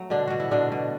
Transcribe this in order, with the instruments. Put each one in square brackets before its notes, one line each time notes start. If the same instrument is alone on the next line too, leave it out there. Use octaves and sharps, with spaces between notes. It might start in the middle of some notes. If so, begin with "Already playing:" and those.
Already playing: [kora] F#3 A3
B2 D3 D4
B2 F#4
E4
B2 D3 D4
B2